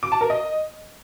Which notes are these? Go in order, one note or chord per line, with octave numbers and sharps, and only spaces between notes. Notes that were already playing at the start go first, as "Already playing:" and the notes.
D6
A5
A#4
D#5